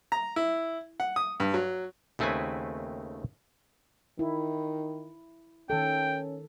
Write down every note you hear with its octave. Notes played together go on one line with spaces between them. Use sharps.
A#5
E4
F#5
D#6
G2
F#3
D#2 C#3 A3 C4 B4 G#5
D#3 E4
D#3 C#4 A4 G5